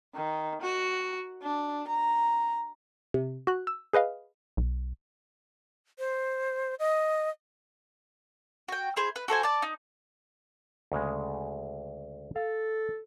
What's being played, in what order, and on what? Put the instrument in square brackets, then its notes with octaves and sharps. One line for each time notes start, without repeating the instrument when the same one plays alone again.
[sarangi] D#3
F#4
D4
A#5
[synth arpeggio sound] C3
F#4 F#6
E6
G#4 B4 D#5 F5
[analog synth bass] B1
[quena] C5
D#5
[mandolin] F#4 G5
E4 G#4 C5
B4
F#4 A4 C5 G#5
D5 A5
D#4
[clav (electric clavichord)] D2 C#3 G#3
[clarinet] A4 [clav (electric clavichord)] F5